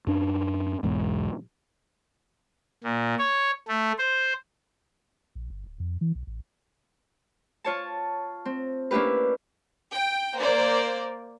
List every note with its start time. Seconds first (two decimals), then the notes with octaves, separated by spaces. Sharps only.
0.07 F#2 D4
0.83 B1 E2 G#2
2.84 A#2
3.19 C#5
3.68 A3
3.98 C5
5.35 A#1
5.50 G1
5.66 D1
5.80 F2
6.01 E3
6.15 B1
6.27 A1
7.64 F4 C#5 A5
8.45 C4
8.91 A#3 C#4 D4 E4 G4 B4
9.92 G5
10.37 A#3 C5 D5